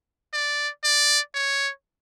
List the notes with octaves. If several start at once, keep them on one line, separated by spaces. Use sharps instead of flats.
D5
D5
C#5